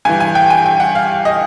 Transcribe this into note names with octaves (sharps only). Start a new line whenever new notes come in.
G2 E3 G#5
G#5
G5
G#5
G5
F#5
F5
D#5